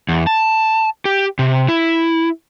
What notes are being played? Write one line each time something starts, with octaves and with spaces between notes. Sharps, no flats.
E2
A5
G4
C3
E4